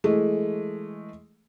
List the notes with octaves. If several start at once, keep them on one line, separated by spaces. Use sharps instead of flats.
E3 G#3 A3